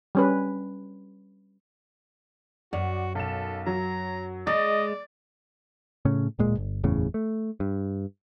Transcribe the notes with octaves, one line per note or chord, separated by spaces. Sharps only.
G3 C#4 B4
F#2 F#4 D5
B1 A4 E7
F#3 A#5
G#3 D5 D#5 A6
A2 C#3 C#4
D1 A#2 G#3
G1
F#1 E2 A2 C#3
A3
G2